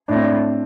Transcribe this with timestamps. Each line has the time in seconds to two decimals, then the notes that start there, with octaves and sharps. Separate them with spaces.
0.08 A2 D4
0.15 C4
0.22 D4